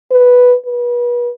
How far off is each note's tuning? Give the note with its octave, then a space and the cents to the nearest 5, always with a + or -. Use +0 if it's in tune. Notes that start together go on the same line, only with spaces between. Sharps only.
B4 +0
B4 -35